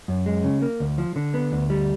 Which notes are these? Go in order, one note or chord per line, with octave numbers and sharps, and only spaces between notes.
F#2
G#3
C#3
A#3
D2
F3
D3
B3
D2
G3